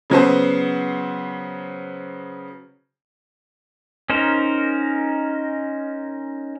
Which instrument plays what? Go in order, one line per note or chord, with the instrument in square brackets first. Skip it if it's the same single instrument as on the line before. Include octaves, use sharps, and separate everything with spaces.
[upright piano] C#3 F#3 B3 C5
[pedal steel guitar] C#4 D#4 A#4 C5